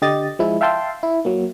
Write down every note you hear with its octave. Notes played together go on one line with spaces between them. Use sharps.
D3 G4 D#5 A6
F3 G#3 E4
E5 F5 G5 A5 C6
E4
F#3 A#3